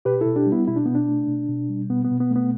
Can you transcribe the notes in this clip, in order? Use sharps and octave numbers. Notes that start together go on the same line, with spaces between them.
B2 G4 B4
B2 E4 A4
D4 G4
G3
B3 E4
B2 E4
D4
B2 B3
D4
A3
B2
B2
G3
B2 B3
B3
B2
B3
A3 B3